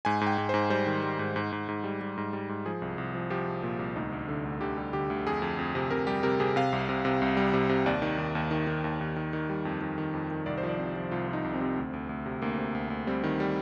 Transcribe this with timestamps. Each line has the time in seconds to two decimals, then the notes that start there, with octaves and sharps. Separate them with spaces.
0.05 G#2 G#5
0.21 G#2
0.27 G5
0.38 G#2
0.49 G#2 C5
0.70 G3 C5
0.87 D#3
1.03 G3
1.19 G#2
1.36 G#2
1.52 G#2
1.69 G#2
1.84 G3
2.01 G3
2.18 G#2
2.33 G3
2.49 G#2
2.66 F3 G#4
2.82 C2
2.98 C2
3.15 F3
3.30 F3 G4
3.48 C2
3.63 A#2
3.79 C2
3.96 D2 D#4
4.12 D2
4.28 D3
4.45 D2
4.61 D3 G4
4.77 G3
4.93 D3 G4
5.10 D2
5.26 F2 G#4
5.42 F2
5.59 F2
5.75 C3
5.90 C3 A#4
6.07 G3 G4
6.23 C3 A#4
6.40 C3 G#4
6.56 C3 F5
6.73 C2
6.89 C3
7.05 C3
7.22 C2
7.37 G3
7.53 C3
7.69 C3
7.86 D#2 D5
8.02 D#3
8.18 D#2
8.35 D#2
8.51 D#3
8.67 D#3
8.84 D#2
9.01 D#2
9.16 D#3
9.33 D#3
9.49 G3
9.65 F2
9.81 D#3
9.98 D#3
10.13 F2
10.31 D#3
10.46 C2 D5
10.58 C5
10.63 F3
10.69 D5
10.79 C3
10.96 F3
11.11 C2 F4
11.28 F3
11.33 D#4
11.44 C2
11.54 C4
11.61 C3
11.77 D2
11.93 D2
12.09 D2
12.26 C3
12.42 D2 A#3
12.58 C3
12.75 D2
12.90 D2
13.07 G3 C4
13.24 D#3
13.40 G3